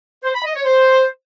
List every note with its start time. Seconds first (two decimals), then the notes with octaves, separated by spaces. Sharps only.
0.24 C5
0.34 B5
0.45 D#5
0.55 C#5
0.66 C5